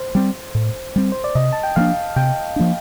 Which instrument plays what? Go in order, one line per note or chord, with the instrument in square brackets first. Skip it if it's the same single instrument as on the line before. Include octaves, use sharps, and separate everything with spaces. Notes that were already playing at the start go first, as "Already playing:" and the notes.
Already playing: [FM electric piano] C5
[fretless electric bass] G3 C4
A2
G3 C4
[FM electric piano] C5
D5
[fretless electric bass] C3 [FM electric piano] D#5
[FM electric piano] A5
G5
[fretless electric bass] F3 A#3 D4 [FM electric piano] F5
[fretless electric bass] C3 [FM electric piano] G5
[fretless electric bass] F3 A#3 D4